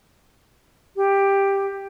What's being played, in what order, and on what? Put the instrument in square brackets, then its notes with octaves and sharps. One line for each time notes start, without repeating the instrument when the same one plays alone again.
[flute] G4